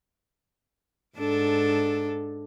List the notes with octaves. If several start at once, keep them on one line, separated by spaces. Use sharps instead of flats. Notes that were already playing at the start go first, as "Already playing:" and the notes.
G#2 D4 A4